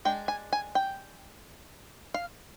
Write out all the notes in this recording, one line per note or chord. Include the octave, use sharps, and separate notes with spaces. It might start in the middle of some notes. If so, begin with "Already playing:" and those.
G#3 D4 G5
G#5
G#5
G5
F5